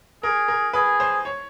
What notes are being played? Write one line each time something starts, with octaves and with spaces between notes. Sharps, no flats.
G#4 A#4
A#4
G#4 B4
C5
C#5